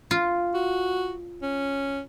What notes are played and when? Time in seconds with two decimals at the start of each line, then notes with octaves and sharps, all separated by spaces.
0.11 F4
0.54 F#4
1.42 C#4